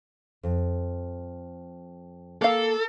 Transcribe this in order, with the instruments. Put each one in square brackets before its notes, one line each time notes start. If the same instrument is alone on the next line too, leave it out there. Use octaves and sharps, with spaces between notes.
[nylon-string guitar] F2
[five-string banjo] A#3 F5 [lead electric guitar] A4